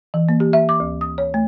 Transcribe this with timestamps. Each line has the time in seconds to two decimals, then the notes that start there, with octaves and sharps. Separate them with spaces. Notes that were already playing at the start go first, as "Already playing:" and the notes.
0.14 E3
0.29 A#3
0.40 G4
0.53 E5
0.69 D6
0.80 D2
1.01 D#6
1.18 C#5
1.34 A3